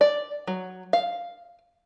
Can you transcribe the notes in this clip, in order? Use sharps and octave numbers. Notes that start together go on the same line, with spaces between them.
D5
F#3
F5